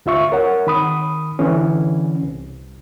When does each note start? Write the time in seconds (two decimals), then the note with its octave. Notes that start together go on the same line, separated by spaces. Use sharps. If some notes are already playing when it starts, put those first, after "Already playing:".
0.06 D2 F4 E5 C#6
0.32 A#4 C#5 F#5
0.67 D#3 B5 D#6
1.39 D3 E3 C#4
2.23 C2